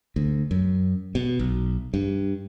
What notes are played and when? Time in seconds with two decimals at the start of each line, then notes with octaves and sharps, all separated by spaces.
0.16 D2
0.51 F#2
1.15 B2
1.39 B1
1.94 G2